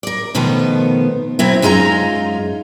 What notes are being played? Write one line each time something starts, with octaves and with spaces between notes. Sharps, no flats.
A#4 D5
B2 D#3 F3 A3 B3
B2 F#3 C4 E4
F#2 G#3 D#4 F4 A4 A#5